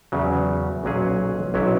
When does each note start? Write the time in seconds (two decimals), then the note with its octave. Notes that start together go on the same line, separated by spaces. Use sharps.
0.12 E2 C#3 F#3
0.84 B1 A#2 F#3 C#4 G#4
1.54 B1 A#2 F#3 C#4 E4